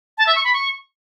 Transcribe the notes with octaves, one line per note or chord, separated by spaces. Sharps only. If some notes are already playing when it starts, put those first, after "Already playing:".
A5
E5
C#6
B5
C#6